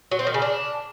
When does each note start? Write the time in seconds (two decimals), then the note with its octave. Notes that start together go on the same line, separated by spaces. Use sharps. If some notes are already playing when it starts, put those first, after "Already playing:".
0.11 F#3
0.19 C4
0.27 D#3
0.34 C#3
0.42 D4